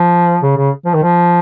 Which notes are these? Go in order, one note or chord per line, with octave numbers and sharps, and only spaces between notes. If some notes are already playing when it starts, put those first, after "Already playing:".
Already playing: F3
C#3
C#3
F3
D#3
F3